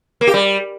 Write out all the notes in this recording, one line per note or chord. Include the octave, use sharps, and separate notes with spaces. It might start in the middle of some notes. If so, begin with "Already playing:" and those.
A#3
G4
G3